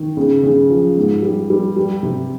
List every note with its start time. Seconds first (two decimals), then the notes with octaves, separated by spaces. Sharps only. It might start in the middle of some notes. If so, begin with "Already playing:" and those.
Already playing: D#3
0.17 C#3
0.43 C#3
0.70 F3
0.97 G#2
1.23 G3
1.50 G3
1.76 G3
2.03 C3